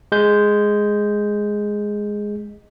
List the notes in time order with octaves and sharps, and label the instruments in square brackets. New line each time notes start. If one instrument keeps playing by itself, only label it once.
[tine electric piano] G#3 G6